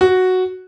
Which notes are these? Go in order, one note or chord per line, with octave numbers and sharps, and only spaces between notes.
F#4